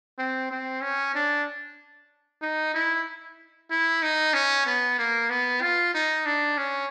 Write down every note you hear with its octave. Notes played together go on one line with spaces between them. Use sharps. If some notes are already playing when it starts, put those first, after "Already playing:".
C4
C4
C#4
D4
D#4
E4
E4
D#4
C#4
B3
A#3
B3
F4
D#4
D4
C#4